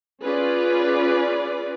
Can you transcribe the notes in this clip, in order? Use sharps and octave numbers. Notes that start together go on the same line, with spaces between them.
C#4 F4 G#4 B4 D5